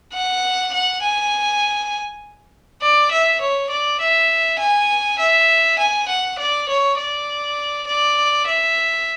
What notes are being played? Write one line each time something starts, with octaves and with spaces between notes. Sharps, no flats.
F#5
F#5
G#5
D5
E5
C#5
D5
E5
G#5
E5
G#5
F#5
D5
C#5
D5
D5
E5